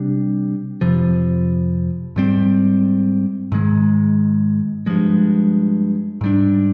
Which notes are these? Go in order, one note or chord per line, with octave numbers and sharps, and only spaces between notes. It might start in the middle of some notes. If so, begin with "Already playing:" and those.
Already playing: C3 G3 D4
F2 C3 F3
G#2 G3 C4
G#2 D#3 G#3
G2 F3 G#3
G#2 G3 D4